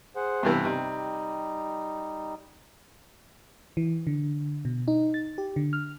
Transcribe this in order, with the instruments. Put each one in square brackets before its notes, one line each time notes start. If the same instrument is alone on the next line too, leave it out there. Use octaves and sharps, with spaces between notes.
[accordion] G#4 C5 F#5
[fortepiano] G2 C3 E3 [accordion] B3
[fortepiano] C3 [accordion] G3 D#4
[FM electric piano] E3
D3
B2
D#4
A6
G4
D3
F6